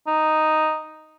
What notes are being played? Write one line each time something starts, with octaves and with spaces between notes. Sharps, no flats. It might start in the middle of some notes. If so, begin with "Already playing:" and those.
D#4